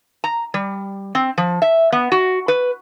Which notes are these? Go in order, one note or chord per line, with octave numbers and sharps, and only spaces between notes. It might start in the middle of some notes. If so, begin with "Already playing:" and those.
A#5
G3
C4
F3
E5
B3
F#4
B4